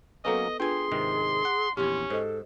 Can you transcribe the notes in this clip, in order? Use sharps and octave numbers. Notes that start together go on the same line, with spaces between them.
F#3 A#3 B3 C#4 A4 B4 D#5
D4 F4 G#4 B4 G5 G#5 C6
G#2 C3 D#3
F#5
A#1 E2 C#4 G4 C6
G#2 A4 C5 D#5